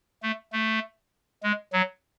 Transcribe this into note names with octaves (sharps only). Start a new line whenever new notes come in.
A3
A3
G#3
F#3